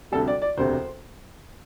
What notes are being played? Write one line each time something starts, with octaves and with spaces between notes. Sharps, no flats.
D2 C3 G3 A4
D5
D5
E1 D2 C3 C5